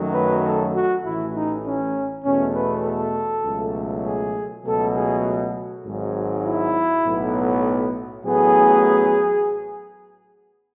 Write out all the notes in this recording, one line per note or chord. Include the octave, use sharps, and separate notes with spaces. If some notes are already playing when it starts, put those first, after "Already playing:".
Already playing: F#2 D#3 F#3 A3
B4
A4
F#4
A1 A2 E3 E4
D#4
C#4
E2 B2 A3 C#4
B4
A4
C#2 B2 F#3 A3
G#4
C#2 B2 F#3 A3 A4
G#4
G#1 G#2 F#3
E4
B1 A2 F#3 B3
A1 A2 F#3 B3 G#4